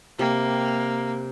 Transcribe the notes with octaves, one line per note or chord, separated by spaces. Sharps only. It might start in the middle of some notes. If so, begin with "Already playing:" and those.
C3 G3 A#3